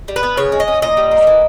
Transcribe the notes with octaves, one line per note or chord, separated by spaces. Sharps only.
G3
B4
B3
C#3 C#5
G#3
D#5
C#4
A#2 D#5
G3
A#3
E3